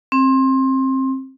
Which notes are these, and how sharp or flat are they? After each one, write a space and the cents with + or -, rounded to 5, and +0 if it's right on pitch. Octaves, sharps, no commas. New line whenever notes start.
C4 +20